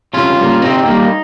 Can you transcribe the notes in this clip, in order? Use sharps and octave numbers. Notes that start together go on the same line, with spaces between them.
C3 C#4 F4
G3 A#3
C3 C4 D#4
G3 A#3